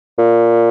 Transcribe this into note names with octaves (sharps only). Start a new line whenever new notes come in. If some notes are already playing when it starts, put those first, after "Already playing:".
A#2